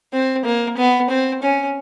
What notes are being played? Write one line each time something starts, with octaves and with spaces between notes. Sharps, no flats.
C4
A#3
B3
C4
C#4